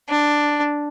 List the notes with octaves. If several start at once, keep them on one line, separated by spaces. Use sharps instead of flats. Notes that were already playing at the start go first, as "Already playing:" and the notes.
D4